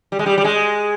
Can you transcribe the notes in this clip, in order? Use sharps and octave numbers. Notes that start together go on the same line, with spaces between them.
G3
G#3
G3
G3
G#3